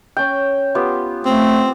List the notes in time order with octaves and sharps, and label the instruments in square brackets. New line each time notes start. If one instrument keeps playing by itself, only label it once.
[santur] C#4 G5
B3 F4 G4
[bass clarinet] A3 [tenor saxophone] C4